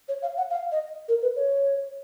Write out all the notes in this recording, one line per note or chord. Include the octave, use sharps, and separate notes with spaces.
C#5
F5
F#5
F5
D#5
A#4
B4
C#5